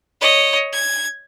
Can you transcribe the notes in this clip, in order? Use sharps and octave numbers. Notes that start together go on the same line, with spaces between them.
C#5 D#5
G#6